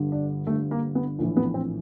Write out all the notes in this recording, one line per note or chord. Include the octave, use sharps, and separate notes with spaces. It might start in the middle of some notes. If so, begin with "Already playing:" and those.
Already playing: G1 G2 D3
D4
G1 G2 D3 A3
A#3
B3
A#1 A2 E3
B3
C4